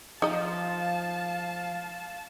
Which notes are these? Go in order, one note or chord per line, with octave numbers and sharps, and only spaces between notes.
F3 D#4 D#5 F5 A5